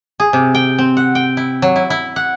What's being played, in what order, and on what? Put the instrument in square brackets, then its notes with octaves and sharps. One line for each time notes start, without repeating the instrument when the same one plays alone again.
[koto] G#4
C3
G5
C4
F#5
G5
E4
F#3
E4
E4
F#5